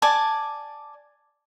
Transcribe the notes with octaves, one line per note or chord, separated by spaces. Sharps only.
D5 G#5 A5